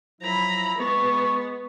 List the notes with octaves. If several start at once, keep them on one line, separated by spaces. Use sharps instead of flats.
F3 F#3 E4 A#5 B5
G#3 B3 C#6